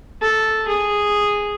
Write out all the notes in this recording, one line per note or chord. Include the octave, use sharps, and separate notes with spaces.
A4
G#4